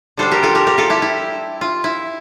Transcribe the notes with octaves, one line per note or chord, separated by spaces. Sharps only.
D3 G3 D4 A4 C5
G4 A#4
F4 A4
G4 A#4
G4 A#4
F4 A4
E4 G4
E4
F4
E4